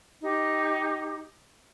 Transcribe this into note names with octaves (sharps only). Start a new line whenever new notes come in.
D#4 G4